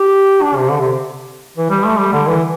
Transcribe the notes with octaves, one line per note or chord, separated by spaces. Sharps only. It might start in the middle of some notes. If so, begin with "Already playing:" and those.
Already playing: G4
D4
C3
D3
C3
E3
G3
A3
G3
D3
E3